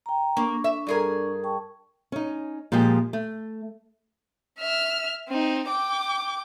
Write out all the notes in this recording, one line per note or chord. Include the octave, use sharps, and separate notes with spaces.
G5 A#5
A#3 D4 C#6
E5
G2 G#4 A#4
G5 A5 C#6
C#4 D#4
A#2 F3 G#3 G4 D#5
A3
E5 F6
C4 D#4
G5 D6